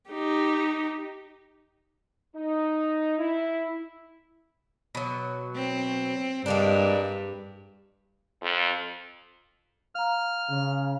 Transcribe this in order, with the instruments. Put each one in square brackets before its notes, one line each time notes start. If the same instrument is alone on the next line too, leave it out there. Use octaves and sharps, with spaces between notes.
[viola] D#4 G4
[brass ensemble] D#4
E4
[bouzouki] B2 F#3
[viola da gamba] C4
[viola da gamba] G2 [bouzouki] G#3 A#3 D4
[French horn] F2
[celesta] F5 A#5 [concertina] F6
[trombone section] C#3